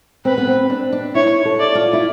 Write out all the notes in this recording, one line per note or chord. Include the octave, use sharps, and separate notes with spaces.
C4 B4
B3
C4
D4
D4
E4 C#5
A4
D5
F4
E4